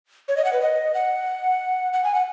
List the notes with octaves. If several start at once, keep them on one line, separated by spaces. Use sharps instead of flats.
C#5
D#5
F#5
B4
D#5
F#5
F#5
G#5
F#5